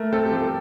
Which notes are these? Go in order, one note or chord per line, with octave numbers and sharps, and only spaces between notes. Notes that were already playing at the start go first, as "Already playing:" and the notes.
Already playing: A3 A#4
C4 A4
G4
F3 A4